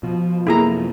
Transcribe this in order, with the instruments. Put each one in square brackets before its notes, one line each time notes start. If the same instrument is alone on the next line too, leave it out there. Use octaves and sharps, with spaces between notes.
[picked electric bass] B2 [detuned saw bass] F3
[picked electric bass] F#2 C3 B3 [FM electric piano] A#3 A4 [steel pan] E4 G#4 A#5